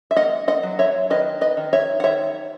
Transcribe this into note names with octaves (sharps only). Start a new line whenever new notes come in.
E5
A#3 D#5 F#5
D#5 F#5
F#3
C#5 E5
D#3 B4 D#5
B4 D#5
D#3
C#5 E5
F#5
D#3 C#5 E5